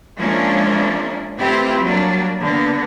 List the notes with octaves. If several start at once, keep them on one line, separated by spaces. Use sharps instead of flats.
F3 G#3 A#3 C#4 D4 E4
A3 C4 E4 F4 G4 B4
F#3 G3 A#3 D4
D3 A#3 B3